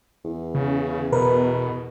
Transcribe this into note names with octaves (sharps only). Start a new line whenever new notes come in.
E2
C#3
B2 A#4 B4